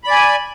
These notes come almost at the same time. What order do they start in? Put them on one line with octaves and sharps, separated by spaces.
B5 D5 G#5